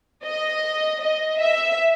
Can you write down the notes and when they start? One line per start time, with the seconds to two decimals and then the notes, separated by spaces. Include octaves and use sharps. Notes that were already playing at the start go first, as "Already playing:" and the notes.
0.24 D#5
1.02 D#5
1.40 E5